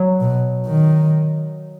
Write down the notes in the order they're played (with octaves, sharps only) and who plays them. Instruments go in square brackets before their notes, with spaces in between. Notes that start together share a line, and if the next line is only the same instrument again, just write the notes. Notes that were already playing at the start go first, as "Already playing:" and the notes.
Already playing: [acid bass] F#3
[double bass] B2
D#3